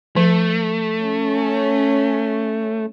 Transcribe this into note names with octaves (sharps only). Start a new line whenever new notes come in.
F3 A3
C#4